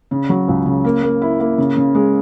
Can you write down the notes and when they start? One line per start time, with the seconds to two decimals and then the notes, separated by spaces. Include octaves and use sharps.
0.11 C#3
0.29 F#3
0.48 C#2
0.66 C#3
0.84 A#3
1.03 A#3
1.22 E4
1.40 A#3
1.58 C#3
1.77 C#3
1.95 G#3